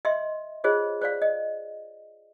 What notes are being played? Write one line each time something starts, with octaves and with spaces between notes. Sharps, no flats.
D#5 E5 C6
F4 G#4 C5 C#5 D#5
C5 D5 F5
D#5